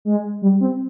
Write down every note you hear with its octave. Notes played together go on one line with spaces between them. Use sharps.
G#3
G3
C4